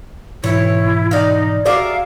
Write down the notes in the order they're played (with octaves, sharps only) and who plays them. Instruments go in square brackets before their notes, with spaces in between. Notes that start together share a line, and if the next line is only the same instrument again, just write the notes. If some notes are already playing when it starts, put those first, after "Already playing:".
[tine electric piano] G#2 B2 E3 [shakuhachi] E4 [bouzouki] C#5
[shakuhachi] D#4 [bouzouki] D5 F5
[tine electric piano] F#4 [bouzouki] G#4 A#4 E5 [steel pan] D5 [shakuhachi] F5